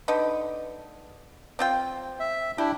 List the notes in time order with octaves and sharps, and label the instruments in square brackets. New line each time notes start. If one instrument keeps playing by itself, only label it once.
[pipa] D3 D#4 B4
C4 F4 G5
[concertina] E5
[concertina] D4 E4 [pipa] G4